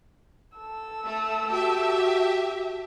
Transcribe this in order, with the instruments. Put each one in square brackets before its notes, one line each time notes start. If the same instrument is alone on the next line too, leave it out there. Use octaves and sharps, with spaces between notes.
[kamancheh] A4 E6
[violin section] A3
[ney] F#4 [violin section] G4 E5